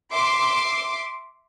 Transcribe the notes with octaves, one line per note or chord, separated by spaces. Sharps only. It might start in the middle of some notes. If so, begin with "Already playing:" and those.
E5 C6 D6